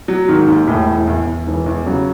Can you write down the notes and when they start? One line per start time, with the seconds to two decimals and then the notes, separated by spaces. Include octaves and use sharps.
0.08 F#3
0.28 G#2 D#3
0.47 D#2
0.68 E1 A2
0.87 E1
1.07 E2
1.27 E2
1.47 E1 E3
1.66 E2
1.86 C#3 F#3